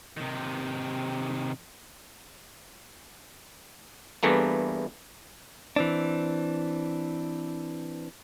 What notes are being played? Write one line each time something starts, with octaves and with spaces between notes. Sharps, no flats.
C3 D#3
E2 G2 E3 A3 A#3
E3 C4 D4